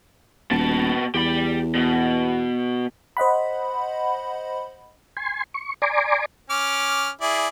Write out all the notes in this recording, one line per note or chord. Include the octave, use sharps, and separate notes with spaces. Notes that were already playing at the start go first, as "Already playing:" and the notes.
D#1 B2 A5
E2 G4 B5
B2
C5 D#5 F#5 B5
G#5 C6
C#6
D5 G#5 A#5 C6 D6
C#4 D6 F6
E4 G#4 D5